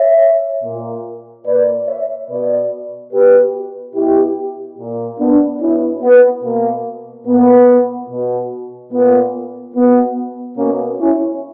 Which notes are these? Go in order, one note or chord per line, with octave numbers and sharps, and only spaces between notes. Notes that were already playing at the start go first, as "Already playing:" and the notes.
Already playing: C#5 E5
A#2
A#2 B4 D5
C#5 E5
B2 B4 D5
B2 G4 B4
B2 E4 G4
A#2
B3 D4
B2 C#4 E4
B3
B2 A#3
A#2 B3
B2
A#2 B3
B2 B3
B2 A#3 C#4
C#4 E4